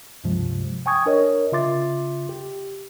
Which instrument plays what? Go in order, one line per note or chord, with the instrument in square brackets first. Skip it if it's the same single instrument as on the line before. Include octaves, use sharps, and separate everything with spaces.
[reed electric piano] C#2 G2 C3 F3 G#3
G5 G#5 C#6 D#6 G#6
D4 A#4 C#5 D#5
C#3 F4 E5 C6 D6 A6
G4